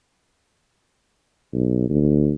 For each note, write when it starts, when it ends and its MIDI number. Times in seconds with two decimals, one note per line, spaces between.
1.53 1.87 35
1.90 2.33 38